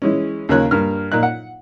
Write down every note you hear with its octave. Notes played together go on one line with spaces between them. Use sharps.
E3 G#3 C#4
D#2 C#3 A#3 F4 C#5 F#6
G2 A#3 F6
A#2 A#3 D#4 F#6
F#5